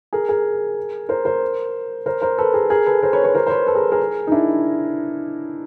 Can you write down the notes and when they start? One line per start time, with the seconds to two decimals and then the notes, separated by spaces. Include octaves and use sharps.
0.13 G#4 A#4
0.29 G#4 A#4
1.09 A#4 C5
1.25 A#4 C5
2.06 A#4 C5
2.22 A#4 C5
2.38 A4 B4
2.54 G#4 A#4
2.70 G#4 A#4
2.86 A4 B4
3.03 A#4 C5
3.13 B4 C#5
3.24 B4 C#5
3.35 A#4 C5
3.46 C5
3.50 B4 C#5
3.67 A4 B4
3.75 G#4 A#4
3.92 G#4 A#4
4.27 D#4
4.32 D4 E4